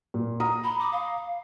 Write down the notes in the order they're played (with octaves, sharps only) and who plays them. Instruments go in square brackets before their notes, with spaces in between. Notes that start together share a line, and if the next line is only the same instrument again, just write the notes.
[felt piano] A#2
A#5 D#6
[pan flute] B5
D6
F5